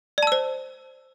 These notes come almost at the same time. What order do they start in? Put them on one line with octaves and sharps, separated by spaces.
D5 A5 E6 C5